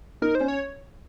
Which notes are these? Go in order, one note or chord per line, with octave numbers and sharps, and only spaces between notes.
D#4 A#4
C5
C#4
C#5